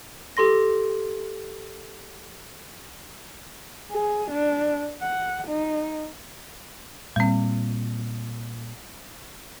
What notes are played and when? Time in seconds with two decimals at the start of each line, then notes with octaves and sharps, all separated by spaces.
0.37 G4 A4 C6 A#6
3.91 G#4
4.31 D4
5.02 F#5
5.47 D#4
7.16 A#2 G3 C4